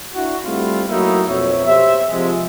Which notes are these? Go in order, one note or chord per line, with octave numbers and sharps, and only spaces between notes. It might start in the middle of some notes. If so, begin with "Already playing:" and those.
D4 E4 F#4
G3 A3 C4 E4 F4
F#3 A3 A#3 D#4 E4
F2 B2 C#5 E5
G4 C5 E5
C3 F3 G#3